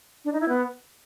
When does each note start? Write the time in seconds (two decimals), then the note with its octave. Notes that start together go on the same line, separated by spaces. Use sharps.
0.25 D4
0.33 D#4
0.41 E4
0.49 B3